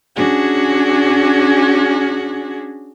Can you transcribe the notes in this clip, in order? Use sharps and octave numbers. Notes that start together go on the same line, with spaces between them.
C#4 D4 F#4 G#4